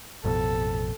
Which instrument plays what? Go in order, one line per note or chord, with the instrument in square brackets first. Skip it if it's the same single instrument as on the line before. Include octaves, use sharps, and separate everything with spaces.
[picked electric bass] A1 F2 B2 [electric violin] A4